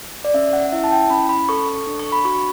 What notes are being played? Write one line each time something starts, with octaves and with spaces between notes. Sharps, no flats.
D5
C#4 E5
F#5
E4 E5
A5
G5
C#4 B5
B5
A4 C#6
C#6
D4
C#6
B5
F#4 C#6